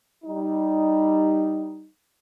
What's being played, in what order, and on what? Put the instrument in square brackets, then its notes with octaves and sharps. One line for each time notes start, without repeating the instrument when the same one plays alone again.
[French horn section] G3 D#4